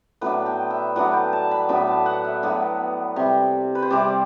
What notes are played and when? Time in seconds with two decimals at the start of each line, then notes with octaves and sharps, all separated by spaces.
0.21 A2 F#3 B3 D4 B4
0.46 G5
0.70 E5
0.96 A2 F#3 B3 D4 F#5
1.13 G5
1.33 A5
1.51 B5
1.69 A2 F#3 B3 D4 B5
1.87 A5
2.06 F#5
2.24 E5
2.43 A2 F#3 B3 D4
3.16 C3 G3 C4
3.75 B4
3.82 C5
3.90 C3 G3 C4 D5